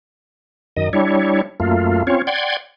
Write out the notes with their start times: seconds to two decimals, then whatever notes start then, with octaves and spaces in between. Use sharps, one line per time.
0.76 F#2 D#3 D#5
0.93 G3 D4 E4 C#5
1.60 F#2 A3 A#3 F4
2.07 C4 C#4 F4 C#5
2.27 D5 F#5 G5 C6 G#6